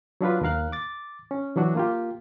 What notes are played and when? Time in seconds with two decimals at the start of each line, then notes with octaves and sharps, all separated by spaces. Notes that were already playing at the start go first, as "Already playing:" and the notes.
0.21 F#3 D4 F4 B4
0.41 D#2 D#3 A#4 F5 F#6
0.72 D6 A6
1.31 C#4
1.56 E3 F#3 D4 F#4
1.75 A#3 F4 G4